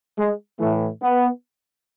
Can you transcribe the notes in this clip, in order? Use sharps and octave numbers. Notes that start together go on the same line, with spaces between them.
G#3
A2 E3 A3
B3